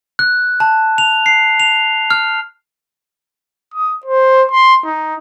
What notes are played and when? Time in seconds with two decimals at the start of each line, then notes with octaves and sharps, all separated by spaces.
0.19 F#6
0.60 A5
0.98 F7
1.26 C7
1.60 F7
2.11 F6
3.74 D#6
4.06 C5
4.51 C6
4.85 D#4